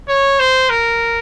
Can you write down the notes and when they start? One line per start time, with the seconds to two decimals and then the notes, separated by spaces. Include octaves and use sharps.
0.09 C#5
0.40 C5
0.70 A#4